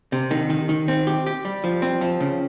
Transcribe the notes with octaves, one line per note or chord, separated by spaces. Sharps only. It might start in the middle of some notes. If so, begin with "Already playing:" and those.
C3
D#3
D#3
D#3
C4
G4
G4
G3
F3
C4
F3
C#3